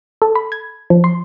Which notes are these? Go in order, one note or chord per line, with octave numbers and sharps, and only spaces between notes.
A4
B5
G#6
F3
C6